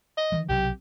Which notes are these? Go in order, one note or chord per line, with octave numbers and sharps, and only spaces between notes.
D#5
D#3 E3 G3
B1 C3 F#3 G4